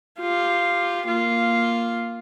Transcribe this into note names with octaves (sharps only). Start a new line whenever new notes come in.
F4 G4
A#3 F4